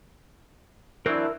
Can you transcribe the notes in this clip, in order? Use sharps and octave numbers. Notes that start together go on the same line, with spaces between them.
E3 F#3 C4 D4 E4 A#4 E6